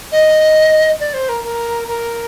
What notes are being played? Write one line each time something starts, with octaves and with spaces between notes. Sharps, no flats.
D#5
D5
C5
A#4
A#4
A#4